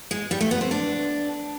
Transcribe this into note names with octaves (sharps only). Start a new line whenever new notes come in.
G#3
G3
A3
B3
C4
D4